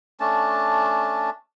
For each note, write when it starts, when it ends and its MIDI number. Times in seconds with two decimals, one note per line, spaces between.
0.20 1.30 57
0.20 1.30 61
0.20 1.30 62
0.20 1.30 81